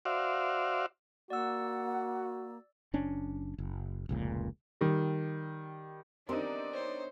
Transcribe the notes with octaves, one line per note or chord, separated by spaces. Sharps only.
F#4 C5 D5 E5 F5
A#3 F#4 D5 F#5 E6
F#1 C#4 D4
F#1
F1 C#2 A#2
D#3 G3
B3 C4 D4 D#4 G4 A#4 D5
C5 C#5